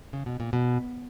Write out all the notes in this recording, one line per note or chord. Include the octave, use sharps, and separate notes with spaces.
C#3
B2
A#2
B2